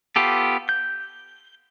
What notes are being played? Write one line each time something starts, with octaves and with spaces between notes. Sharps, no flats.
B3 F4 G4 A4
G6